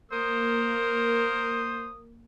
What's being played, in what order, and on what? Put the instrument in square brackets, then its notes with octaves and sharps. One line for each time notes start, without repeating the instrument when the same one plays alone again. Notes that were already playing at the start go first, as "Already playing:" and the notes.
[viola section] A#3 [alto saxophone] A#4 [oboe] C5 [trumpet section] D#6